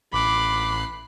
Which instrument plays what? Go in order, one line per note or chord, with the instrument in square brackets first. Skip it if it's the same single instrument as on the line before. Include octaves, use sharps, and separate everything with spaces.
[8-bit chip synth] A1 F#6 C7 [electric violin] B5 [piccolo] D6